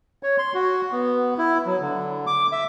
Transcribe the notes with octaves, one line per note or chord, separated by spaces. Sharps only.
C#5
C6
F#4
B3
E4
F#3
D3
D6
E5